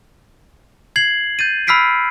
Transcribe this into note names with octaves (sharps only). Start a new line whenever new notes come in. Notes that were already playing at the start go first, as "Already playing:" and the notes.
G#6 C7 F#7
G6 A6 D#7
B5 E6 F6 B6 C7 D7